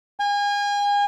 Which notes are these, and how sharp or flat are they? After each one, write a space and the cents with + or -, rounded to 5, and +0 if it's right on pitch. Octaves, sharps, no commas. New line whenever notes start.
G#5 -35